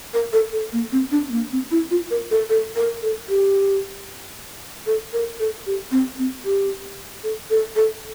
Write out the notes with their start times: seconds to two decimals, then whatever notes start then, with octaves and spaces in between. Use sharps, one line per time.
0.14 A#4
0.33 A4
0.53 A4
0.73 A#3
0.92 C4
1.11 D4
1.28 C4
1.32 A#3
1.52 C4
1.71 E4
1.91 F4
2.11 A#4
2.31 A4
2.49 A4
2.76 A#4
3.02 A4
3.29 G4
4.87 A4
5.13 A#4
5.40 A4
5.66 G4
5.92 C4
6.18 C4
6.45 G4
7.24 A4
7.50 A4
7.76 A4